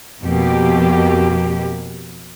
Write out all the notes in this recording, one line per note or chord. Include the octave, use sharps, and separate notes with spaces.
F2 B2 A#3 G4